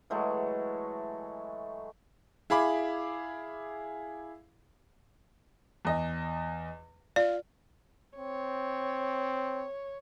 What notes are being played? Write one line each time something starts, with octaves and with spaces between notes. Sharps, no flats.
E3 F#3 G#3 A3
E4 G#4 F5 B5 D6
E2 D#5
F4 D5
C4 C#5